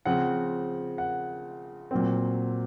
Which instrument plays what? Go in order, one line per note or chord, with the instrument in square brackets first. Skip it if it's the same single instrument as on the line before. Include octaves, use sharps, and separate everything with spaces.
[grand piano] C#3 F3 C4 F#5
F#5
A#2 F#3 C4